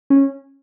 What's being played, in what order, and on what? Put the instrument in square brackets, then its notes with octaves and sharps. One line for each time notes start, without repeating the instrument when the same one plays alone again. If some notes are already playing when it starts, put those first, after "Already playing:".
[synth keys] C#4